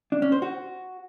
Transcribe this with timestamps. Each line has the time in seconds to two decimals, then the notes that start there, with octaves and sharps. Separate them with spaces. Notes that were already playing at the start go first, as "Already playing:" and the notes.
0.12 D4
0.22 C#4
0.32 C5
0.42 F#4